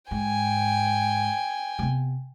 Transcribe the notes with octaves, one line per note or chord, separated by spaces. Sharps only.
G#2 G5 G#5
C3 B3